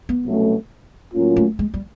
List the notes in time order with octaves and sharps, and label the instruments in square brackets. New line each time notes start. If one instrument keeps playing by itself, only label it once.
[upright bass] B3
[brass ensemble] C2 B2 F#3 A3 C#4
A2 F#3 A#3 C#4 F4
[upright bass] A3
G#3
G3